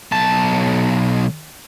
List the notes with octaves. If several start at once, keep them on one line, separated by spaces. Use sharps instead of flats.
B1 A5